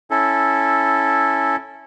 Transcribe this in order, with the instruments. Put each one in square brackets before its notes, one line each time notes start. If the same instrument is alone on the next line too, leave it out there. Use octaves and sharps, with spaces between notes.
[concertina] C#4 E4 A4